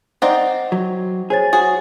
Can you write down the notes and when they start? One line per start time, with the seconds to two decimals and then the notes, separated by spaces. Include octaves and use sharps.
0.22 C4 D#4 D5 F#5
0.72 F#3
1.30 G#4 C5 C#5 A6
1.53 F#4 G#4